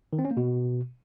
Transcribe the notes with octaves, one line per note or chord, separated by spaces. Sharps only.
D#3
C4
C#4
A#3
B2